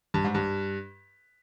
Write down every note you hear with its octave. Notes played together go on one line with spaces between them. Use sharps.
G2
G#2
G2